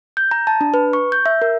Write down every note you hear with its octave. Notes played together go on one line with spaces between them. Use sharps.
G6
A#5
A5
D4
B4
C#6
G6
E5
A#4